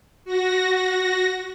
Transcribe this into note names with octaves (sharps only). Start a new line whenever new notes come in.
F#4 A#6